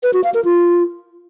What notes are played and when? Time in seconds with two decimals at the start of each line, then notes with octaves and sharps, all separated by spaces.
0.03 B4
0.13 F#4
0.24 F5
0.34 A#4
0.45 F4